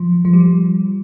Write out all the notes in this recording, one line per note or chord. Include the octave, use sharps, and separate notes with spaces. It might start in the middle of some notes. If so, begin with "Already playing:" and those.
Already playing: F3
F3
G3